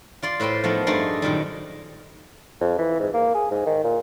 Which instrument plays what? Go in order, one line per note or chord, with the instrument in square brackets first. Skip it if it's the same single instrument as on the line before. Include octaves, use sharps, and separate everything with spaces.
[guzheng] F4 D5 C6
A2 B4 C5 G5 C6
F3 A3 B3 D#4 A#4
G2 A3 D#4 G#4 D5 C6
F#2 A#2 D#3 G3
[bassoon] F2
E3
G#2
A#3
G#4
G#2
D#3
A#2